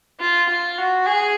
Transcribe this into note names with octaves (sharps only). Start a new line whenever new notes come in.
F4
F4
F#4
G#4